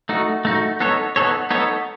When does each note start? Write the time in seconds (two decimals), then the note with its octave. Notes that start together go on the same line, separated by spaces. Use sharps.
0.09 A3 D#4 F#4
0.45 A3 D#4 F#4
0.80 B3 D#4 A4 C#5
1.16 B3 D#4 A4 C#5
1.50 B3 D#4 A4 C#5